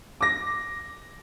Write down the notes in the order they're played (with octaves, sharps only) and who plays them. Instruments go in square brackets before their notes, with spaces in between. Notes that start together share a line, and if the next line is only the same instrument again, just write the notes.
[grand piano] D6 A#6